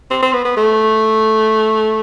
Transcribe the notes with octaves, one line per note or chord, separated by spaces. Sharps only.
C4
C4
B3
B3
A3